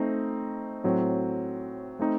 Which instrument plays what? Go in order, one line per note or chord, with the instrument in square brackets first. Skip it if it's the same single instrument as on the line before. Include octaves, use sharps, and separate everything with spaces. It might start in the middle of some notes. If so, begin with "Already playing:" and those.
Already playing: [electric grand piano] A3 C4 D#4
A2 F#3 C4
A3 C4 D#4